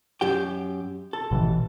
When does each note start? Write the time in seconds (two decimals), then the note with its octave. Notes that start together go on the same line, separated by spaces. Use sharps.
0.21 F#2 G4 G5
1.13 A4
1.31 A1 B2 E3